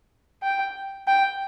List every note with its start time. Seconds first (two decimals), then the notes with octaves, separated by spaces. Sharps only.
0.43 G5
1.07 G5